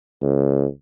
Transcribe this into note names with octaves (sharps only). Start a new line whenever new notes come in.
C#2